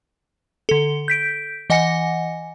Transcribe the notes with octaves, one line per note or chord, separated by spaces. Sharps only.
D3 A4
G6 B6 D7
E3 D#5 F#5 G#5 A#6 C#7